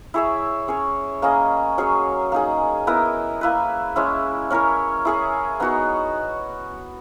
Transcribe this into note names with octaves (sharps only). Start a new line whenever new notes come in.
E4 G#4 C#5 E5
C#4 G#4 C#5
A#3 C#4 G#4 D#5
F#3 C#4 G#4 C#5
A#3 D#4 G#4
B3 E4 A#4 D#5
A#3 E4 B4
G#3 C#4 E4
C#4 E4 A#4 C#5
E4 G#4 C#5
B3 D#4 F#4 C#5